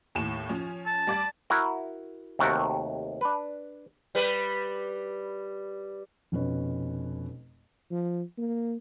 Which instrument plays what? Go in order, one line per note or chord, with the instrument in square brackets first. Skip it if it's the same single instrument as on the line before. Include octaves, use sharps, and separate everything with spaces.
[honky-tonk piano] D#2 A2 E7
F3 C#4
[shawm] A5
[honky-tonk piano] G3 D5 A6
[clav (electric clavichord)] E4 F#4 A#4
D#2 C3 A3 F#4 A#4 F#5
D4 B4
[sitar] G3 B4
[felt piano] F1 B2 C#4 B4
[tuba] F3
A#3